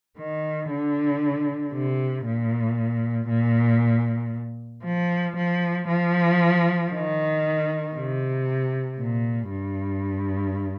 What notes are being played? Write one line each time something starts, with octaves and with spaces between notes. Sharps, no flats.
D#3
D3
C3
A#2
A#2
F3
F3
F3
D#3
C3
A#2
G2